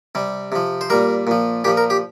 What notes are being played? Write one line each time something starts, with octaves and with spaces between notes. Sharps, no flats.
C3 G3
C3 F3
C5
A#2 G3 A#4
A#2 F3
A#2 F3 G4
A#4
G4